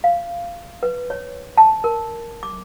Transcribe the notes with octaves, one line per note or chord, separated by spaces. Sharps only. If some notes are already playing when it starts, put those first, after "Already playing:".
F5
B4
C#5
A5
A#4
D6